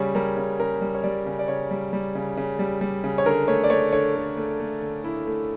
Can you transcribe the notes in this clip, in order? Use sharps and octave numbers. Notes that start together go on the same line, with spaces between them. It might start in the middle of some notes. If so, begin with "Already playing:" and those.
Already playing: C#3 G3 C#5
G3 A#4
C#3
C#3 A#4
G3
C#5
G3 D5
C#3
D5
C#3 C#5
G3
G3
C#3
C#3
G3
G3
C#3
C#5
D3 A#4
A3 C#5
D5
A3 C#5
D3 C#5
D3
A3
A3
D3
D3 E4
A3